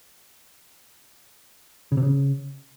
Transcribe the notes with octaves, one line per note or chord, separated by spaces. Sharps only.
C#3
C3
C#3